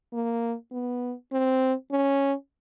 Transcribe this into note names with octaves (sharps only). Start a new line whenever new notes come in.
A#3
B3
C4
C#4